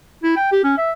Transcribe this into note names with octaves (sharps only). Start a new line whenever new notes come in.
E4
G5
G4
C#4
E5